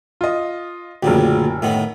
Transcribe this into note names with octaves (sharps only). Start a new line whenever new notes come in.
F4 D#5
F#1 D2 A#2 C#3 G4
A2 D#3 B3